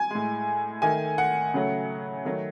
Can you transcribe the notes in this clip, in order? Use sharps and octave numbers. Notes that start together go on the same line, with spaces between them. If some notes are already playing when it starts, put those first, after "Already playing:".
Already playing: G#5
A2 G#3
D#3 A3 G#5
F#5
C#3 F#3 A3
D#3 F#3 A3